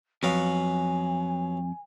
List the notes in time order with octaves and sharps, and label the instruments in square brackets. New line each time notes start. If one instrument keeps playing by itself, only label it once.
[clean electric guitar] F2 [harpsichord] F#3 B3 F5 [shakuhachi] G#5